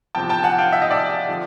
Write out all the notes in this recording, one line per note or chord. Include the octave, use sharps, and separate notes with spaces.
E2 C3 F3 G5 A5
G5 A5
F#5 G#5
F5 G5
E5 F#5
D#5 F5
D5 E5
D3 F3